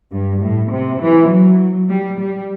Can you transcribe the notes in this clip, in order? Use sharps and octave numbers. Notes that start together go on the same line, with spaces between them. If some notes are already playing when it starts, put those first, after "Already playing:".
G2
A2
C3
E3
F#3
G3
G3